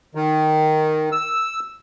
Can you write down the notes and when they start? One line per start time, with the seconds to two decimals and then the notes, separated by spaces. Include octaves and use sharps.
0.15 D#3
1.12 E6